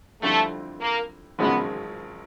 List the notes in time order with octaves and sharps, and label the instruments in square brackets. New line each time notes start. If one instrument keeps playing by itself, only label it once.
[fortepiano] F2 D3 G3 C4 E4 [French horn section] A3
[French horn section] A#3
[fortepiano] G#1 F#2 C#3 F3 G#3 [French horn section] B3